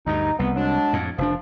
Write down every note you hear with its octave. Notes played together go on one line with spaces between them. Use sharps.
D2 G2 D#4
C2 B3
F#3 G#3 D4
F2 A2
F1 F3 D4